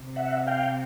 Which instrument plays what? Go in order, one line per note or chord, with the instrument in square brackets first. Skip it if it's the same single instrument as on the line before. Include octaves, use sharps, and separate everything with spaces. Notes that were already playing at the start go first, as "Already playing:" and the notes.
Already playing: [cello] C3
[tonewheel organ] E5 F#5
F5 G5